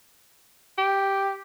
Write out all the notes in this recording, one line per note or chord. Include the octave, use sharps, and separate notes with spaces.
G4